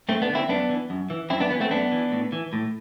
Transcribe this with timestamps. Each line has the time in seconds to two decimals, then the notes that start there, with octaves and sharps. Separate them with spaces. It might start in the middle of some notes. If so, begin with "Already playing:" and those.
0.09 G2 A3 C4
0.22 B3 D4
0.29 D3
0.35 C4 E4
0.49 F#2 B3 D4
0.69 E3
0.90 F#2
1.10 E3
1.30 F#2 C4 E4
1.40 B3 D4
1.50 E3 B3
1.60 A3 C4
1.71 F#2 B3 D4
1.91 E3
2.12 A2
2.32 E3
2.53 A2